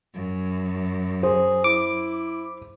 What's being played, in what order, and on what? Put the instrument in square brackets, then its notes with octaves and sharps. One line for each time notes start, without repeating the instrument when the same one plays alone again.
[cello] F#2
[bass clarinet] G#4 [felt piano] C5
[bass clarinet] E4 [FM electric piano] D6